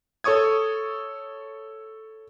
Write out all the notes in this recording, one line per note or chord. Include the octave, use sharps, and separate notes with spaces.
A4 C#5 C#6 D#6 G#6